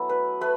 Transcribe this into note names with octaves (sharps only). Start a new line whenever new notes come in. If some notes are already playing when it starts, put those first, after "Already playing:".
Already playing: F#3 A3 B3 E4
B4
A3 B4